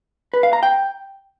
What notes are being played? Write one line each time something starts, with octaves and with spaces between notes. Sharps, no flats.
B4
F5
A#5
G5